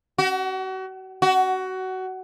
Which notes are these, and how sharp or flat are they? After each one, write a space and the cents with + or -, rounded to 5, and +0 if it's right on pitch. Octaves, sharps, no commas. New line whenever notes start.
F#4 +35
F#4 +20